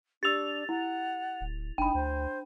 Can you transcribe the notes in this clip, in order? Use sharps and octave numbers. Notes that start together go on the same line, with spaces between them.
D4 G4 E6 A6 F7
E4 F#5
D1
F#1 D4 D#4 G5 B5
D2 C5